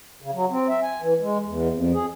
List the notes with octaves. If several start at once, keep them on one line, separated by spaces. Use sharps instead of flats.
C#3
F#3
C4
E5
G#5
E3
G#3
E2
F2
G#4